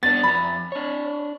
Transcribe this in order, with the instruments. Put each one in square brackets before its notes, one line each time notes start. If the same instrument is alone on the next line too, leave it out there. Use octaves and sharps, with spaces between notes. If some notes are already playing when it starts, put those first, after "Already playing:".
[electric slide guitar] B3 D4 [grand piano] A6
[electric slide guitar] F2 A#5 [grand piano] B5
[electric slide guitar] D4 C#5